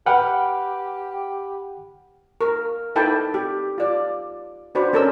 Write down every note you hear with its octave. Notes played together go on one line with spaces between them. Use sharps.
G4 B4 F#5 G5 F6
A#4
D#4 E4 A4 B4 G5 A5
G4
F4 D5
D4 F#4 B4 C5 D5 B5
C#4 A4 A#4 C5 E6